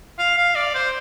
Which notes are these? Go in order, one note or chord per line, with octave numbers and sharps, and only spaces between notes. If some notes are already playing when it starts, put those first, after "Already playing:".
F5
F5
D5
C5